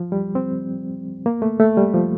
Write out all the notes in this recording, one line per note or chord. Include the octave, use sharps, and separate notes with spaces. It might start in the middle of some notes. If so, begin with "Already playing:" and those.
Already playing: F3
G3
C4
A#3
A3
A3
G3
F3